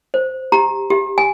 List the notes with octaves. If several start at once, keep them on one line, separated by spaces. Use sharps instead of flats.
C5
G4 A#5
G4
G#5